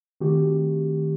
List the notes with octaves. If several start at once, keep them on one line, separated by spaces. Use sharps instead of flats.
D#3 A3 C4 F#4 G4